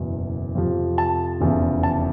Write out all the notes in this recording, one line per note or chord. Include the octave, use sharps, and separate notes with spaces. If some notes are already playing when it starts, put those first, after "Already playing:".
Already playing: F#1 E2 B2
F2 C3 F3
A5
F1 E2 C#3 E3
A5